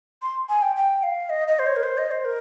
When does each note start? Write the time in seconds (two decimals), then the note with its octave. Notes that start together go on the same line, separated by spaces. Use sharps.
0.22 C6
0.49 G#5
0.62 G5
0.76 G5
1.03 F5
1.30 D#5
1.48 D#5
1.59 C5
1.66 C#5
1.76 A#4
1.83 C5
1.98 D#5
2.11 C5
2.25 A#4